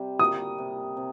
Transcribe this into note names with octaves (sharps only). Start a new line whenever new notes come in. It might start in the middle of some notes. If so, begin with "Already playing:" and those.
Already playing: C3 G3
A#3 D#6
C3
C3